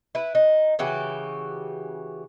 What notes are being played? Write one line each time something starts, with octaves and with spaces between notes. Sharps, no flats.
E4 B4
D#4
C#3 E3 F#4 G4